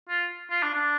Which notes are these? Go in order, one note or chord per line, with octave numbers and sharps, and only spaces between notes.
F4
F4
D4
D4